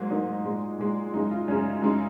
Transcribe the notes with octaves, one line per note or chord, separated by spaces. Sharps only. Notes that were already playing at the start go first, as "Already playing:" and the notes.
Already playing: G#2 F#3 A#3
G#2 F#3 A#3 D#4
A#2 G#3
A#2 G#3
F#2 C#3 G#3 D#4
F4
F#2 C#3 G#3 C#4
F#2 C#3 G#3 D#4